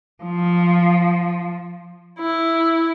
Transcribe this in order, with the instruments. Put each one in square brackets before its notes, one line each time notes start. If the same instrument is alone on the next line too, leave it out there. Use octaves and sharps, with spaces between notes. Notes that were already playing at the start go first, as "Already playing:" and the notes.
[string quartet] F3
E4